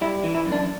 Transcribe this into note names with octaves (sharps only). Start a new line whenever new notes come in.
G3 E4
E3
E4
F#2
D4